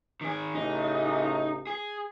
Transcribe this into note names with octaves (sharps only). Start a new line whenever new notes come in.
D#3 G#4
A1 C#3 D#4
G#4